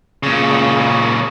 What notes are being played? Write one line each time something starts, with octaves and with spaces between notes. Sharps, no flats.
A#2 C#3